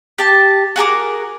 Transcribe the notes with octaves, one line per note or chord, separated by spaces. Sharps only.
G4 A5
F#4 G#4 A#4 D6